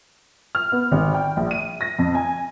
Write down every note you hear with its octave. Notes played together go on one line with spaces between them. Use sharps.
F6
B3
G#1
G5
A#1
D#7
A#6
F2
G#5